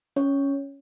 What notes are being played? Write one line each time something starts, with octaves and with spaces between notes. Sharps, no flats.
C#4 C#5